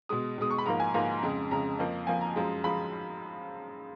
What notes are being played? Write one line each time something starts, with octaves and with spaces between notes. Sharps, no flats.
B2 G#3 D#6
B2 G#3 D#6
C#6
B5
G#2 F3 A#3 A#5
G#5
G#2 F3 A#3 A#5
F2 C#3 G#3
F2 C#3 G#3 A#5
F2 F3 A#3
F2 F3 A#3 G#5
A#5
F#2 F3 G#3
F3 G#3 B5